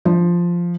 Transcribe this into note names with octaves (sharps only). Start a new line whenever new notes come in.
F3